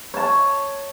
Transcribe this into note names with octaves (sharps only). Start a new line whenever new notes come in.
C#5 A5